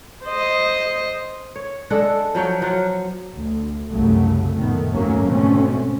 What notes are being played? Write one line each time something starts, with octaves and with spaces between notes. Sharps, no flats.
C5 D#5
C#5
G#3 D4 A4 F#5
F3 F#3 C#5 G5
F3 F#3 F4 F#5
D2
C2 F#2 C#3 F#3 A3
F#2 A#2 D#3 A3 B3
D#2 G#2 F#3 A3 A#3 C#4
G#2 B2 D3 A3 C4 C#4